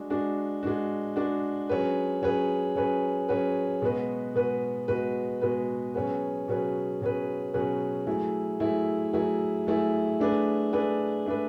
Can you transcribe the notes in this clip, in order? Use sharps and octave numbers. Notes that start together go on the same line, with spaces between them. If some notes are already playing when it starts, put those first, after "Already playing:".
Already playing: G#3 D4 F#4
G#3 D4 F#4
G#3 D4 F#4
G#3 D4 F#4
F#3 C#4 G#4 B4
F#3 C#4 G#4 B4
F#3 C#4 G#4 B4
F#3 C#4 G#4 B4
B2 G#3 B3 F#4 B4
B2 G#3 B3 F#4 B4
B2 G#3 B3 F#4 B4
B2 G#3 B3 F#4 B4
B2 F#3 C#4 G#4 B4
B2 F#3 C#4 G#4 B4
B2 F#3 C#4 G#4 B4
B2 F#3 C#4 G#4 B4
F#3 A3 E4 G#4
F#3 A3 E4 G#4
F#3 A3 E4 G#4
F#3 A3 E4 G#4
A3 D4 G#4 B4
A3 D4 G#4 B4
A3 D4 G#4 B4